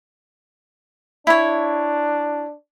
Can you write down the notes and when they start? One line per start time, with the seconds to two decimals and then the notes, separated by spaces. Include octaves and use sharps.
1.27 D4 E4 C#5